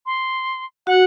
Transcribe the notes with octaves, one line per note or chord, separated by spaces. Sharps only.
C6
F#4 F#5